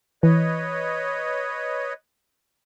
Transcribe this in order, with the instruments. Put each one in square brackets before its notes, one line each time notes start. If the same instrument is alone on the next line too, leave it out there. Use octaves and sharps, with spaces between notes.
[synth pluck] E3 [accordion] B4 C#5 D#5